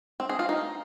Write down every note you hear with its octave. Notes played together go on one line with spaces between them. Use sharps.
C4
G#4
F4
D#4